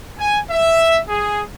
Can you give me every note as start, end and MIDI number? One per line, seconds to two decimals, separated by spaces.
0.19 0.38 80
0.50 1.00 76
1.09 1.43 68